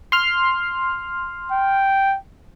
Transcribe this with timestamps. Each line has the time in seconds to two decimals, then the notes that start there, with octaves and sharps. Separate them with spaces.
0.12 C6 F6
1.52 G5